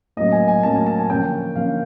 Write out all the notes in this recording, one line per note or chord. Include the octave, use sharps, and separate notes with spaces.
A2 F#3 A#3 C#4 D#5
G#5
G#5
A2 F#3 A#3 C#4 A5
G#5
A5
G#5
D3 F3 A#3 C#4 G5
D3 F3 A#3 C#4 F5